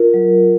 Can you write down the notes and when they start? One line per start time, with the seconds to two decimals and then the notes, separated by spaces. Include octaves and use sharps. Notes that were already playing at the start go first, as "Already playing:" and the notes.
Already playing: F4 A#4
0.14 F#3